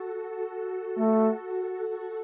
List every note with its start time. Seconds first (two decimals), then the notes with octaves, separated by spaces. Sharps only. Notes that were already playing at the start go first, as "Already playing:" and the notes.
Already playing: F#4 A4
0.46 F#4 A4
0.98 A3
1.50 F#4 A4